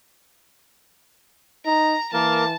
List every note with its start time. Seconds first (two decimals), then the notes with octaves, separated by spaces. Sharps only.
1.65 D#4 A#5
2.13 E3 A#3 A#4 A5